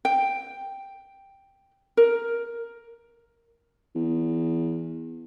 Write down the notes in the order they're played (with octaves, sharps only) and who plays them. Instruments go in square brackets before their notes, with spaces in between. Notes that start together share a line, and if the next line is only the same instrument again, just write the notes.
[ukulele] G5
A#4
[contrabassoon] E2